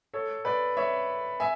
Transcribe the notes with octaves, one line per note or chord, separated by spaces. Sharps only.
A4 C#5
B4 D5
C#5 E5
E5 G#5